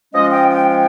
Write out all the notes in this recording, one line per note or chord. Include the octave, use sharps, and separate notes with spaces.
F3 G#3 C#4 D#5
G5
G5
G5